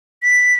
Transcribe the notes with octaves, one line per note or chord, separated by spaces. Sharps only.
B6